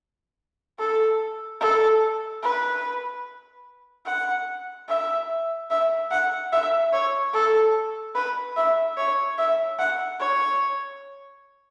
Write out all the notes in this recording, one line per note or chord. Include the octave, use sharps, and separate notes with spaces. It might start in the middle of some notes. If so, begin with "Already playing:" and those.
A4
A4
B4
F#5
E5
E5
F#5
E5
C#5
A4
B4
E5
C#5
E5
F#5
C#5